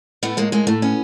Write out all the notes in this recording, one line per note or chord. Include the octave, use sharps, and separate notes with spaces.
A2 A3 B3
A2 G#3 A#3
A2 G#3 A#3
A2 A3
B3 C#4